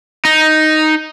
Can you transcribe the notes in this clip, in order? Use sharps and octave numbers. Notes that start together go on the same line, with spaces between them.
D#4